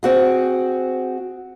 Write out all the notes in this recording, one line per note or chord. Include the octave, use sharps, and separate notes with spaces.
C4 F#4 G#4